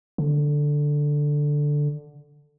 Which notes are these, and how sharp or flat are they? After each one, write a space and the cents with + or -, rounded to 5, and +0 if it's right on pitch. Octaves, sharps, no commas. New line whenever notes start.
D3 +0